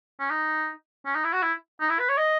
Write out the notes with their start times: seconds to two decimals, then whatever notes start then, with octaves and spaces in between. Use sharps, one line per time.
0.20 C#4
0.30 D#4
1.06 C#4
1.15 D#4
1.24 E4
1.33 F#4
1.43 E4
1.81 D#4
1.90 E4
1.99 B4
2.09 C#5
2.18 D#5